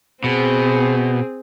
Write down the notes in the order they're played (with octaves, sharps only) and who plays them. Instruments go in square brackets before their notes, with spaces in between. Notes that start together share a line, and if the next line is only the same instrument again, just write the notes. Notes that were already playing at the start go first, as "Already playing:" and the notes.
[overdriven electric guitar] B2 [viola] C4 G#4